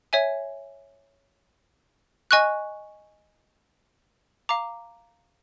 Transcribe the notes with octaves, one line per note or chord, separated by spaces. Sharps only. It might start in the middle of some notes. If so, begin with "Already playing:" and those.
C#5 E5 G#5
D#5 G#5 C#6 F#6
F5 A#5 D6